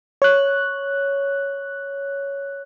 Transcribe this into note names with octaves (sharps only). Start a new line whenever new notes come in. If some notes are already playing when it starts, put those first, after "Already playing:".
C#5 F#6